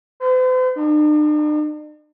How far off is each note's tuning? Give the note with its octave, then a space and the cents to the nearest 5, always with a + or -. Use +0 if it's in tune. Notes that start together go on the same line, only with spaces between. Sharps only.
C5 -45
D4 +45